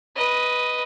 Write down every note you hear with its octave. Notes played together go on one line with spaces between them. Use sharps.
B4 D#5